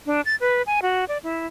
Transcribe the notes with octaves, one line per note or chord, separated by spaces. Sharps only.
D4
A6
B4
G#5
F#4
D5
E4